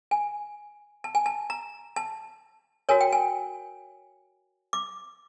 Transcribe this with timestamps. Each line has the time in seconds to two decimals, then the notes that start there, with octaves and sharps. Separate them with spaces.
0.11 G#5
1.04 A5
1.15 G#5
1.26 A5
1.50 A#5
1.96 A5
2.89 F#4 A#4 C#5 G#5
3.01 G5
3.13 G#5
4.73 D6